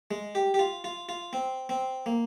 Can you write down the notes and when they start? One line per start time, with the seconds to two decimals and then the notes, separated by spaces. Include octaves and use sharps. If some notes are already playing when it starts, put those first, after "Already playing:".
0.11 G#3
0.35 G4
0.54 G4
0.59 F4
0.84 F4
1.09 F4
1.33 C4
1.69 C4
2.06 A#3